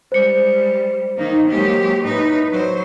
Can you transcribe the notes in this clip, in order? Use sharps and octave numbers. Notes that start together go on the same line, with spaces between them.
G3 G#3 C5 C#7
D#3 A#3 D#4
F#3 G#3 A#3 G4
A2 D#4 B4
F#3 C5